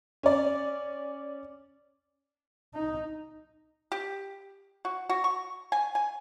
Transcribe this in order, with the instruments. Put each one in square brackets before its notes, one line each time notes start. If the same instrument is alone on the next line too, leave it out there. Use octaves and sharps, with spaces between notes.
[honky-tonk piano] C#4 D5
[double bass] D#4
[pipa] G4
F#4
F#4
C#6
G#5
G#5